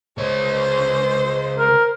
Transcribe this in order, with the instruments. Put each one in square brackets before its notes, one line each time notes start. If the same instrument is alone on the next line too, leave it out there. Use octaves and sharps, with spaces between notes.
[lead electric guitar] C#2 C#5 [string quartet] C5
[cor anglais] A#4